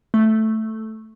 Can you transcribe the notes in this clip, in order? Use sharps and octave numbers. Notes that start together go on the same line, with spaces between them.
A3